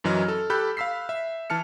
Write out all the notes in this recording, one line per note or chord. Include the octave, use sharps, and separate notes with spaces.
F#2 E3 F#3 D#5 F6
A4
G4 A4 B5 F#6 G6
F5 B5 E6 B6 C7
E5
E3 A5 F6 C#7